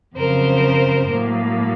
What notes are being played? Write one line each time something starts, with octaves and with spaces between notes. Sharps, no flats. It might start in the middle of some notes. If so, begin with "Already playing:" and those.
F2 C#3 F#3 A#4 C5
A2 F#3 A#3